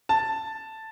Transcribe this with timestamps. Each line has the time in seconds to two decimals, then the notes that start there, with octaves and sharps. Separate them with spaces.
0.09 A5